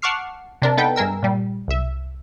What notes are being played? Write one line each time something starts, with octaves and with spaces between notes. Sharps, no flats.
F#5 A5 C#6 D6 F6 C7
C3 D4 A#4
B3 D#4 A4 B4 G5
G2 G#4 A#4 E6
A#2 G3
C2 E5